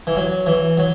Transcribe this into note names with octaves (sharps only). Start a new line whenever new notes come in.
E3
F#3
E3
F#3